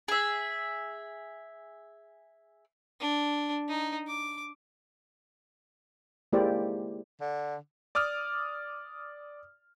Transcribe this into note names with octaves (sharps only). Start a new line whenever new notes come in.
G#4 E5
D4
D#4
D6
G#3 A#3 E4 G4 C5 D5
D3
D5 D6 D#6 F6